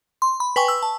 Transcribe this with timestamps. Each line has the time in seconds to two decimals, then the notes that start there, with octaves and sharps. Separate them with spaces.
0.22 C6
0.40 B5
0.56 B4 G5 G#5 C#6
0.68 E6
0.82 A5